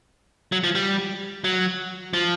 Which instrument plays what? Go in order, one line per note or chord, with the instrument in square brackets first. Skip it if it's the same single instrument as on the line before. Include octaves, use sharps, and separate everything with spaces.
[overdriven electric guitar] F#3
F3
G3
F#3
F3